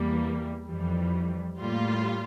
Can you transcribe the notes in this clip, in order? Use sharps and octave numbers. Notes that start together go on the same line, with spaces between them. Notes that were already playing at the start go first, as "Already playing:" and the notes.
Already playing: E2 E3 G3 A#3
F2 E3 G3
A2 G3 A#3 F4